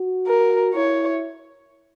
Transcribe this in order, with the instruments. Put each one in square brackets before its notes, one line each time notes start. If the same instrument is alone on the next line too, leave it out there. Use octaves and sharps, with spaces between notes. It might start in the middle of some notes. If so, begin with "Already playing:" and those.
Already playing: [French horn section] F#4
[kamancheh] A#4
[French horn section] E4 [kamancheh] C#5